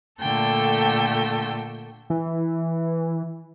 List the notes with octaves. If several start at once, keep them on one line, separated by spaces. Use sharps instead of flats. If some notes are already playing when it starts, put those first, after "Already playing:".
A#2 D3 A3 A4 G5
E3